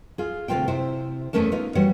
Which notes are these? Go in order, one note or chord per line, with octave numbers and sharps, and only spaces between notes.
F4 G#4
D2 C3 E3 F4 C5 G5
C3 E4 C5
E2 F3 A3 C#4 A#4 A5
B3 D#4 F4
E3 G3 F#4 C#5 F#5